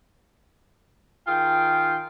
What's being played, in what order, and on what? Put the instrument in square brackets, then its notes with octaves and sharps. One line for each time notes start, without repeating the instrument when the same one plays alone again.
[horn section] D#3 F4 G#4 G5